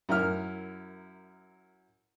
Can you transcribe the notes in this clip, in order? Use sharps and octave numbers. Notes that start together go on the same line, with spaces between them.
F#2 E4 A#4 F6